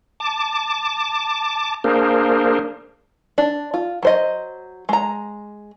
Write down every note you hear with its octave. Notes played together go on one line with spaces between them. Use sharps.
A5 D6
A#3 D4 G#4 A#4 C5
D4
F4
F#3 C5 D#5
G#3 A#5